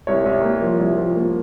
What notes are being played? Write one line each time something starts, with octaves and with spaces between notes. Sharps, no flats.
C2 C#5
C2
A#3
F3
C2
F3
A#3